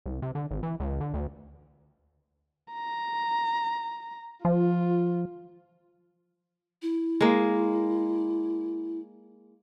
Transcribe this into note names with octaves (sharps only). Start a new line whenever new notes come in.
C2
C3
D3
G#1
E3
C#2
D3
D2
A#5
F3 F4
E4
G#3 A#3